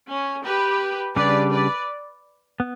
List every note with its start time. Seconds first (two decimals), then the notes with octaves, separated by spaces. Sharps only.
0.08 C#4
0.44 G4 B4
1.16 C#3 G3 D4 G4 B4 D5
1.52 B4 D5
2.60 B3